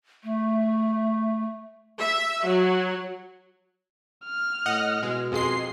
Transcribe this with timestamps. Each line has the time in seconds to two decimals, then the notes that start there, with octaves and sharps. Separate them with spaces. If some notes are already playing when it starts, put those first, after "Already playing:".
0.23 A3
1.98 E5
2.43 F#3
4.26 F6
4.66 A2 D#5 F#5
5.03 B2 G#3
5.32 F2 G#3 G#4 C6 C7